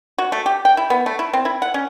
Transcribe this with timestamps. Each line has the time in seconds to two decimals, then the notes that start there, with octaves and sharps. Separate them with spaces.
0.18 F#4
0.32 A3
0.46 G4
0.65 G5
0.77 E4
0.90 B3
1.06 A3
1.19 E4
1.33 C4
1.45 E4
1.62 F#5
1.74 C#4